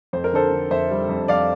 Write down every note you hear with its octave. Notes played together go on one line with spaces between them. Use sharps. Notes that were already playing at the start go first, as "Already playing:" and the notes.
F2 C5
A#4
D3 A4 C5
D3
F2 C5 E5
G3
F2
F2 D5 F5